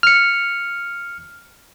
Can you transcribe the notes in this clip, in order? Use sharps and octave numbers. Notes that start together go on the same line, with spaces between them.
F6 C#7